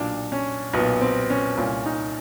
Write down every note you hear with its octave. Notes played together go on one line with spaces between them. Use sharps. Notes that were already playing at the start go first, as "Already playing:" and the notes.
Already playing: B1 A#2 D4
C#4
B1 A#2 B3
C4
C#4
C2 A#2 C#4
D#4